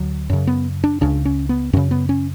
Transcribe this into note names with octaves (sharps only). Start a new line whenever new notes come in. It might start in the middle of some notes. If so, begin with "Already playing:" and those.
Already playing: D2 D3 F#3
F#2 C#3
B3
D4
C#2 C#3 D4
C#4
B3
F#2 C#3 C#4
B3
C#4